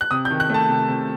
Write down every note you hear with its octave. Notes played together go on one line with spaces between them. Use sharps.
F#6
C3 D#6
G6
D#3
F#6
A3 A5
C3
C3